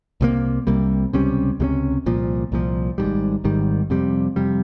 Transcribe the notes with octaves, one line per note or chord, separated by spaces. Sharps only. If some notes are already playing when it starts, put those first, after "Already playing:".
C2 C3 G3 A#3
C2 C3 G3 A#3
C#2 C3 G3 C#4
C#2 C3 G3 C#4
C2 A#2 F3
C2 A#2 F3
G#1 G#2 D#3 G3
G#1 G#2 D#3 G3
F2 C3 G3
F2 C3 G3